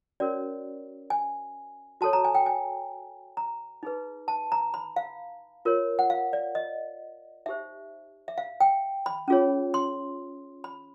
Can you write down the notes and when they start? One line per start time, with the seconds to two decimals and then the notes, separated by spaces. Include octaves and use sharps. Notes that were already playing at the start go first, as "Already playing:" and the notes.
0.20 C#4 F#4 A#4 C#5 D5
1.10 G#5
2.01 F#4 A4 C#5 A5
2.13 A#5
2.25 G#5
2.35 G5
2.46 G#5
3.37 A#5
3.83 D#4 G#4 B4
4.28 A5
4.52 A#5
4.74 B5
4.96 F5
5.65 F4 A#4 C#5
5.99 F#5
6.10 F5
6.33 D5
6.55 D#5
7.46 D#4 G4 C5 E5
8.28 E5
8.38 F5
8.60 G5
9.06 B5
9.28 C#4 F4 G#4 C#5
9.74 C6
10.64 B5